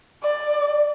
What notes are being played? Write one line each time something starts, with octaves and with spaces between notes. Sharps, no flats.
D5